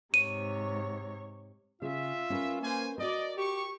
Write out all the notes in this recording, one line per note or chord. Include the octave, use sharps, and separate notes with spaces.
G#2 C3 C#5 D#7
C#3 F4 G#4 E5
C#4 A#4 B4
A#3 C5 G#5
F#4 A#4 D5 D#5
G4 C#6